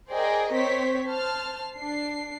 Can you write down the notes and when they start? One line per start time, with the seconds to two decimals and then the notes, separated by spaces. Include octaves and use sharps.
0.11 G#4 A#4 C5 D5 D#5 G5
0.53 C4 C5 C#5 B6
1.07 C5 A5 F6
1.75 D4 C7